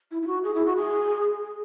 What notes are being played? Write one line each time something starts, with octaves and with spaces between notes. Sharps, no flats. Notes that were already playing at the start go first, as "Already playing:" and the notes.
E4
E4
F#4
G#4
E4
F#4
G#4
G#4